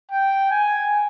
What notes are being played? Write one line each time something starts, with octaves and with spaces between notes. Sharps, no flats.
G5
G#5